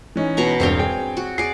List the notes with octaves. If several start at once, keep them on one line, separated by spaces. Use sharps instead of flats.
E3 C#4 D#4
B2 A#5 C#6
E1 G2 C4 C#5 F5 G7
G#4 G5
F#4
G#4 D5 C7